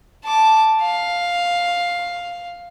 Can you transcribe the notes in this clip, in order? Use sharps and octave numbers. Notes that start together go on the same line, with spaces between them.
A5 D6
F5